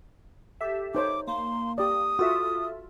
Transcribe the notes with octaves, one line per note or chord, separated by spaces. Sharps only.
G4 A4 E5
D#4 C5 C#5 D6
A#3 C6
G4 D5 D#6
F4 F#4 A4 E5